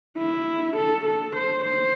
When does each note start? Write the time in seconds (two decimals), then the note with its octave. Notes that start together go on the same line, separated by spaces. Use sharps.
0.18 E4
0.77 A4
1.05 A4
1.36 C5
1.65 C5